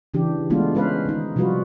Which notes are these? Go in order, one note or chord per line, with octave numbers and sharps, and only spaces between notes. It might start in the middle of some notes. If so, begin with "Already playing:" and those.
C#3 E3 D4 G4
G#3 A3 B3 D4 F4
G#3 C#4 B4 C5 F5
D#3 D#4
C3 F3 G3 F4 F#4 B4